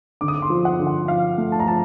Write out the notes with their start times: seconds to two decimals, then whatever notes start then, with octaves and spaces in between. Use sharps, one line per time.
0.21 D3 D6
0.28 D#6
0.35 D6
0.42 C6
0.50 F3
0.65 F#5
0.79 D3
0.87 F#5
1.08 F3 F5
1.38 A3
1.52 A5
1.60 A#5
1.66 F3 A5